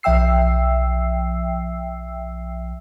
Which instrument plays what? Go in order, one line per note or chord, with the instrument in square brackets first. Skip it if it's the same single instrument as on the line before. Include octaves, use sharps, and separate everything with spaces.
[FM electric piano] B1 F3 E5 G5 E6 C7